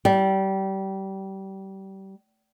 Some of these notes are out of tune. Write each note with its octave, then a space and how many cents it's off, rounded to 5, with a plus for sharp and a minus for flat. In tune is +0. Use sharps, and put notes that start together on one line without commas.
G3 -25